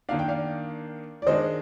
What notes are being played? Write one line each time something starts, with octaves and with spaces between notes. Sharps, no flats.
D#3 A#3 D4 F5
G5
D5 F5
D5
D#3 G#3 D4 C5 D#5